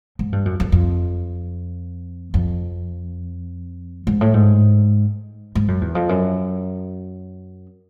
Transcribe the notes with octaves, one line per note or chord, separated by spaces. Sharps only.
G#2
G2
F#2
F2
F2
F2
G#2
A2
G#2
G#2
F#2
E2
F2
F#2